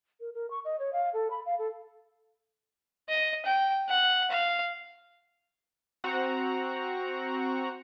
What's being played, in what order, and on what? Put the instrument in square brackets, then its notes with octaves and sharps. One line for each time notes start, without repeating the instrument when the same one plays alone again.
[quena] A#4
A#4
C#6
D#5
C#5
F5
A4
B5
F5
A4
[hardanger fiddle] D#5
G5
F#5
F5
[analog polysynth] C4 F#4 F#5 A#5